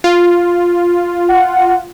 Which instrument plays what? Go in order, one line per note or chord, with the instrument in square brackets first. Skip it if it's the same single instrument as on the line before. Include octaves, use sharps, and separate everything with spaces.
[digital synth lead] F4
[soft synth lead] F#5